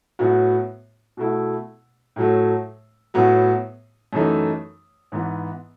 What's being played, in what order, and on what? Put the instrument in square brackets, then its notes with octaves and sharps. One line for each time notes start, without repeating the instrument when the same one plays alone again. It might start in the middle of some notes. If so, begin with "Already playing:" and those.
[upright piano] A2 F#3 B3 F#4
B2 A3 E4
A2 F#3 A3
A2 F#3 B3
F#2 E3 A3 D#4
G#2 E3 B3